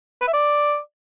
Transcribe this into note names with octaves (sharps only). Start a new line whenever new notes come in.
B4
E5
D5